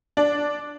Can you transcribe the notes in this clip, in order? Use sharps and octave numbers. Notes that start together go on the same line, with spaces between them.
D4